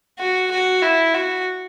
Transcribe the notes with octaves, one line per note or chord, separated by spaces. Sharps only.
F#4
F#4
E4
F#4